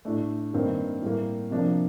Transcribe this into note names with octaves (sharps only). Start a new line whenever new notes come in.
A2 A3 D4
G2 D#3 A#3 C4
A2 G3 A#3
C3 F3 A#3 D4